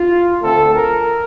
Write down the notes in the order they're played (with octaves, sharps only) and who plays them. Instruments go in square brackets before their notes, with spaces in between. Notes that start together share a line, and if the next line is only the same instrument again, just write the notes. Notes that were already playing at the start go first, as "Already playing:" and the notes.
Already playing: [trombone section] F4
D2 D3 A3 C4 A4
A#4